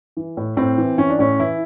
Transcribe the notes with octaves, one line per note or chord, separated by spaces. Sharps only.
E3
A2
A2 C4
E3
E3 C#4
D4
A2 C#4
E3 E4